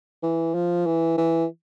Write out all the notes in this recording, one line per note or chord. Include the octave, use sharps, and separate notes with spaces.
E3
F3
E3
E3